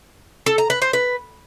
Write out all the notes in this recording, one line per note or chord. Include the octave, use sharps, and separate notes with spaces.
A4
A#5
B4
C5
B4